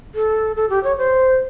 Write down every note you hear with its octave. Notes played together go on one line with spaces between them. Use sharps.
A4
A4
G4
C#5
C5